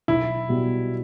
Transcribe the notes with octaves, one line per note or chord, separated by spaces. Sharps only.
B1 E4
B2 G3 B3 G4